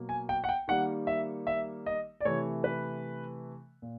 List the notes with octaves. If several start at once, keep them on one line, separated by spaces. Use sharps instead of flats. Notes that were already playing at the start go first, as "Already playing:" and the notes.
Already playing: B2 F#3 A#3
G#5
G5
F#5
G5
D#3 G3 A#3 F#5
E5
E5
D#5
D5
C3 E3 A3 C#5
B4
A#2